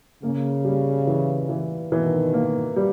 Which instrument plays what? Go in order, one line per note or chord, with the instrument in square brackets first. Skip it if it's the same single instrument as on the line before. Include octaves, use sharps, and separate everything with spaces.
[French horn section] C#3 [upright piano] A#3
[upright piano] G3
E3
E3
[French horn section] B2 D#3 [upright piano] E3
[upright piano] A#3
G3